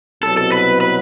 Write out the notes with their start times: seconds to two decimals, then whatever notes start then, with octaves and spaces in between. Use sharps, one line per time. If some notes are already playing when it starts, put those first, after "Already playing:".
0.22 C2 B2 F#3 A4
0.37 A4
0.52 B4
0.81 B4